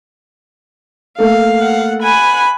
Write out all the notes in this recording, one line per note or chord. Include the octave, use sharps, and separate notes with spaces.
A3 A#3 A4 F5
F#5
F#5 G#5 B5